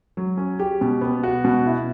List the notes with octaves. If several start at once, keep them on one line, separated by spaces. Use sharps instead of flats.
F#3
C#4
G4
B2
B3
F#4
B2
E4